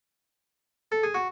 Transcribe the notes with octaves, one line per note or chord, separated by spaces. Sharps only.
A4
G#4
F#4